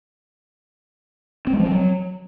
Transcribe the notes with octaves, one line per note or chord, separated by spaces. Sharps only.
C4
G#3
F3
C4
F#3